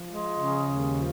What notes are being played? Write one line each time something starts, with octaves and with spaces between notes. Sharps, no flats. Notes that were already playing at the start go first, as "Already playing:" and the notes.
Already playing: F3
G#3
C#3
D#2
F3